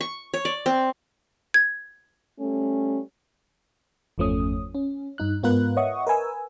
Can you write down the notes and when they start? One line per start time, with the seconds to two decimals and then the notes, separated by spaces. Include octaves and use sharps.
0.01 C#6
0.34 C#5
0.45 D5
0.66 C4
1.54 G#6
2.40 G3 A3 C#4
4.18 G1 E2 F3 A3 C#4 D#6
4.75 C#4
5.18 G2 D#4 F#6
5.43 G#2 B3 F4 A#4 B4 F#6
5.77 C#5 D#5 E5 F#5 C#6 D#6
6.07 A#4 B4 G#5 E6